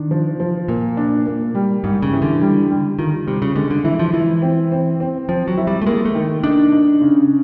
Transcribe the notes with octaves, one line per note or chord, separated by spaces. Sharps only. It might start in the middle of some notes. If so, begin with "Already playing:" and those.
Already playing: D#3 D4
F3
F3
A#2 A#3
D4
A#3
G3
G#2 G3
C#3
E3
D3
G3
G3
D#3 F4
C3 G3
C#3
D3 G#3
D3
E3 E4
F3
E3 E4
C4
C4
C4
F3 C4
F#3
E4
G3
A3
G#3 A#3
A3
D#3
D4 D#4
D#4
C#3